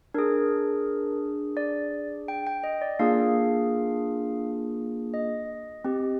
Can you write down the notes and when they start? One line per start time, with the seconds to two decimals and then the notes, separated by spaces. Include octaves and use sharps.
0.14 D4 G#4 A#4
1.57 D5
2.28 G5
2.47 G5
2.64 D#5
2.82 D5
2.99 A#3 D4 F4 G#4 F5
5.14 D#5
5.85 C4 G4